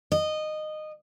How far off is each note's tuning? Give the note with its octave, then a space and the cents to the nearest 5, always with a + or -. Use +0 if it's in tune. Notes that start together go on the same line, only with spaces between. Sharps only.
D#5 -15